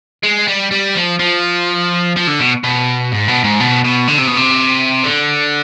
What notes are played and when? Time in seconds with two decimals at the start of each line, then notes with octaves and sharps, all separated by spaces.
0.23 G#3
0.48 G3
0.72 G3
0.95 F3
1.19 F3
2.16 F3
2.27 D3
2.40 B2
2.64 B2
3.12 G#2
3.28 B2
3.44 G#2
3.60 B2
3.84 B2
4.08 D3
4.18 C3
4.27 B2
4.36 C3
5.04 D3